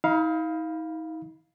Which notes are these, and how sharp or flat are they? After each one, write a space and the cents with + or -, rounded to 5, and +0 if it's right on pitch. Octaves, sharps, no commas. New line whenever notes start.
D#4 +40 F5 +0 B5 +0